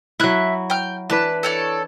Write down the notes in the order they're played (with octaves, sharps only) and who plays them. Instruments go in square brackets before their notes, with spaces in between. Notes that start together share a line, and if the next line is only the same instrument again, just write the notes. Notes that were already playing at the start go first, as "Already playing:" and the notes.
[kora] F#3 E4 [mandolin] E5 F#6
[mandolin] G5 F6
[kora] E3 D4 B4 [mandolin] A5
[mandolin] A4 C#5 D5